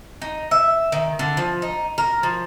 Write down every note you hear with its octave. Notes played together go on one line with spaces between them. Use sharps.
D#4
E5
D#3
D3
F3
D#4
A#4
F3